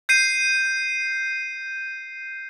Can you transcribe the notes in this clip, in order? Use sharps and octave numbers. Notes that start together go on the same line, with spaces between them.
G6 C7 D#7